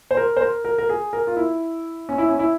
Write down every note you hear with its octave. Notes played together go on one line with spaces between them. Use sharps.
C5
A#4
C5
A#4
A#4
A#4
G#4
A#4
F4
E4
C#4
E4
C#4
E4